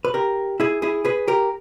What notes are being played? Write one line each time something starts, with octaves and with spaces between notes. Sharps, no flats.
B4
G4 A#4
E4 G#4
E4 G#4
G#4 B4
G4 A#4